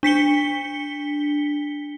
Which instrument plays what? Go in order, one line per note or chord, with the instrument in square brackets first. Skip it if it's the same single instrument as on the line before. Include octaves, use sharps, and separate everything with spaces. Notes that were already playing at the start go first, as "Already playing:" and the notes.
[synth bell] D4 B6 C#7 G7